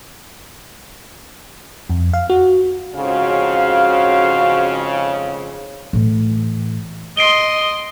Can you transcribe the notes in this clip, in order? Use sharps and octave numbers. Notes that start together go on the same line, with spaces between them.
F2
F5
F#4
F2 G#2 C#3 F#4 C5 F5
A2 E3
D#5 C6 C7 D7 G7